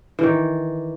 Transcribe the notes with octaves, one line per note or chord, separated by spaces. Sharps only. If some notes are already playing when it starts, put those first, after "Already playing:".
D#3 E3